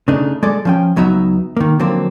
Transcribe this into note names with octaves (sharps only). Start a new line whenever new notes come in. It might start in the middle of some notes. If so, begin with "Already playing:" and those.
C#3 A3 D4 D#4
G#3 A3 A4 D5
F3 C#4 G5
C#2 F#3 B3 D#4 E5
D#3 A#3
D3 F3 F#3 A#3 C4